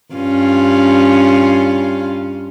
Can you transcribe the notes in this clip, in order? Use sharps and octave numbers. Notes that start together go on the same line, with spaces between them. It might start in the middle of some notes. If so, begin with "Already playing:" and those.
G2 C#4 F4